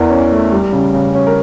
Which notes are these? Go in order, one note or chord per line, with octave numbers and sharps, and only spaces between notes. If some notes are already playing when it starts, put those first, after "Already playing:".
Already playing: E2 E3 A#4 D5
C#4
A3
G3
C#3
C#3
C#4
A#4